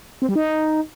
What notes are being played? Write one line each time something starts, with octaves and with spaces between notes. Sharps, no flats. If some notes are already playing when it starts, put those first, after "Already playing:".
C4
G3
D#4